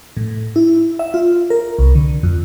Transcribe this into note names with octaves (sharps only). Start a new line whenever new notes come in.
A2
E4
E5
F4
A#4
C2
D3
F2